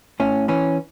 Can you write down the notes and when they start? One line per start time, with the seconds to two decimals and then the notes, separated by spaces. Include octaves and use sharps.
0.20 A2 C#4
0.48 E3 C#4